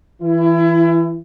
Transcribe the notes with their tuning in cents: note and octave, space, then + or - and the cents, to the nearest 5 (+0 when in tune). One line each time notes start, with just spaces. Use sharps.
E3 +0 E4 +30